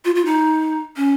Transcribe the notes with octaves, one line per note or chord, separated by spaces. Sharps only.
F4
F4
D#4
C#4